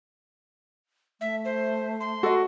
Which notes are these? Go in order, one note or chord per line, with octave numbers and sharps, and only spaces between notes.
A3 E5
C5
C6
F#4 A4 D#5